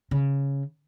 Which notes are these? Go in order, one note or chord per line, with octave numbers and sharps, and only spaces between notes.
C#3